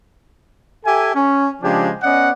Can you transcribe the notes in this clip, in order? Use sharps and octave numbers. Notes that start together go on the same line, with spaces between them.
G4 A4 E5 G#5
C#4
C#3 F3 G#3 D4 G4
B3 C#4 D5 D#5 F#5